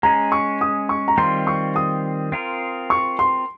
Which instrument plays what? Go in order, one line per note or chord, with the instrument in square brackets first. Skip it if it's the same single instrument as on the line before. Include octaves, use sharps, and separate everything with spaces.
[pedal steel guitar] G#3 C#4 G#4 [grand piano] A#5
[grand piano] C#6
D#6
C#6
A#5
[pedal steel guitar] D#3 G3 C4 F4 [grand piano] C6
[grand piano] C#6
D#6
[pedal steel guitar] C4 F4 A#4
[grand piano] C#6
C6